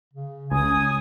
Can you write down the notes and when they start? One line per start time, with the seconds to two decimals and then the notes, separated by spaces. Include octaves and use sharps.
0.13 C#3
0.51 C#2 C#4 G#5 D#6